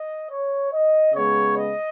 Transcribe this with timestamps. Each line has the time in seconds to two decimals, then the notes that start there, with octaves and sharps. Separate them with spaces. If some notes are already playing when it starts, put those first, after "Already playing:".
Already playing: D#5
0.30 C#5
0.72 D#5
1.13 C#3 G#3 B3 C#5
1.56 D#5